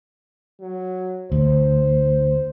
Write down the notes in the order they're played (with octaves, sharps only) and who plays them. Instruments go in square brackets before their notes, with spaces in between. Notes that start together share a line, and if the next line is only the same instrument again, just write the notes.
[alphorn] F#3
[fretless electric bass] D2 [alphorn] C5